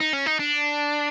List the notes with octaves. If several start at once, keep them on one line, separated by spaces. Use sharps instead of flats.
D#4
C#4
D#4
D4